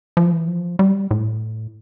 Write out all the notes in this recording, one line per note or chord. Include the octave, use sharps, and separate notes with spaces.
F3
E3
F3
G3
A2